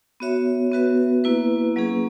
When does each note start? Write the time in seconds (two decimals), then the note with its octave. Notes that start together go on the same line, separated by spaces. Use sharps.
0.20 B3 F#4 C#5 E5
0.71 B3 F#4 B4 E5
1.24 A#3 E4 B4
1.76 F#3 A#3 C#4 G#4